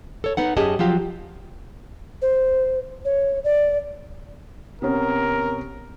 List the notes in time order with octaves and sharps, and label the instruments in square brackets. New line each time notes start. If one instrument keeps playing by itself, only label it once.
[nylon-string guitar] A4 C#5
B3 D#4 F#5
F#2 C#4 G4 G#4 D#5 A5
F3 F#3 F4 G4
[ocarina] C5
C#5
D5
[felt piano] C3 B3 C#4 [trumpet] A#4